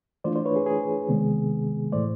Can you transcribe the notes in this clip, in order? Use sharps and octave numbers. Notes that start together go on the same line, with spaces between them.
E3 A3 D4 F4 C5 D5
C5 D5
B4 C#5
G#4
G#4
C3 D#3 G#3 B3
A2 E3 A3 C5 D5